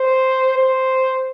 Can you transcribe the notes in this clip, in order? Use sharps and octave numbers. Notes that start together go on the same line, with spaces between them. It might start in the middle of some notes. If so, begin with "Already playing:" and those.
Already playing: C5
C5